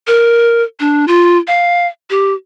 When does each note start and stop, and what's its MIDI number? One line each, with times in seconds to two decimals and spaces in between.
0.07 0.63 70
0.80 1.05 62
1.08 1.37 65
1.47 1.87 77
2.10 2.33 67